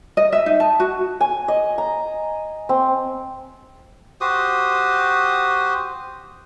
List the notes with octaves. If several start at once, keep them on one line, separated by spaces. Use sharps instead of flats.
D#5
E5
D#4
A5
F#4
G#5
D#5
A#5
C4
F#4 G4 C5 D#6